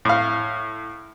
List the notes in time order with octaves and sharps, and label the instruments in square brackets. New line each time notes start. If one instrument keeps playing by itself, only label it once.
[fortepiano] A2 F5